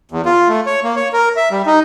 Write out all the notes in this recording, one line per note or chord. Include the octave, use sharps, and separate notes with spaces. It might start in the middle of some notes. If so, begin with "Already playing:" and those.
E2
F4
A3
C#5
A#3
C#5
A#4
E5
G3
D#4